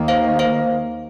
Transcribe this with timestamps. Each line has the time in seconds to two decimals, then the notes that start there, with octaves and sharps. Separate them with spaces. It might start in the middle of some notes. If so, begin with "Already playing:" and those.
Already playing: D#2 D#3 A#3
0.08 C5 F5
0.39 C5 F5